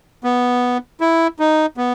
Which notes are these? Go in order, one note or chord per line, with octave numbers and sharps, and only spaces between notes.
B3
E4
D#4
B3